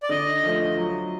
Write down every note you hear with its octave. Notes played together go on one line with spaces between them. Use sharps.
D5
D3 D#5
F3 A3
F#3